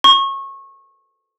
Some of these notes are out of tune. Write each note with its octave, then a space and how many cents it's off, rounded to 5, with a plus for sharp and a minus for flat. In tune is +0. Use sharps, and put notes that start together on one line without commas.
C#6 -25